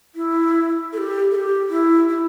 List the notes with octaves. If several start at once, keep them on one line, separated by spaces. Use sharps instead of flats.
E4
A4
G4
A4
G4
E4
E4